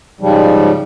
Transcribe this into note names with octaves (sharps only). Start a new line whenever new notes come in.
G#2 C#3 F3 G3